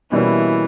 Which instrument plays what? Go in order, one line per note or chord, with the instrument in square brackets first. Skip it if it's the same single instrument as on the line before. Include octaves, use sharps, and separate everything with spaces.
[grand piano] B2 G3 A#3 C#4 E4 [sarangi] E3